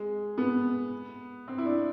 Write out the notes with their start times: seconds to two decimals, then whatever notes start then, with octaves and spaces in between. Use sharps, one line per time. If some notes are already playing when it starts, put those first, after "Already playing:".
Already playing: G#3
0.38 B3
1.48 C4
1.58 E4
1.65 D4